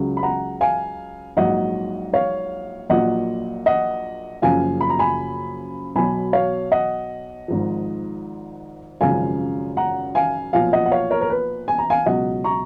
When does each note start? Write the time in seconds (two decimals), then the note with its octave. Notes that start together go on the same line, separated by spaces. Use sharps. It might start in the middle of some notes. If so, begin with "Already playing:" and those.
Already playing: C#2 C#3 F#3
0.17 B5
0.23 F#5 A#5
0.61 F5 G#5
1.37 A#1 G#2 F#3 D#5 F#5
2.13 C#5 F5
2.89 A#1 A#2 F#3 D#5 F#5
3.66 D#5 F#5
4.42 F#1 F#2 C#3 F3 F5 G#5
4.81 B5
4.90 A#5
4.99 G#5 B5
5.95 B1 B2 F#3 G#5 B5
6.33 C#5 F5
6.72 D#5 F#5
7.48 G#1 G#2 F3
9.01 G#1 F#2 C#3 F3 F5 G#5
9.77 F#5 A#5
10.15 F5 G#5
10.53 B1 A#2 F3 F5 G#5
10.73 D#5 F#5
10.86 F#5
10.92 C#5 F5
11.11 A#4 C#5
11.21 A#4
11.30 B4
11.68 G#5
11.78 A#5
11.90 F5 G#5
12.06 C#2 B2 F#3 D#5 F#5
12.44 A#5 C#6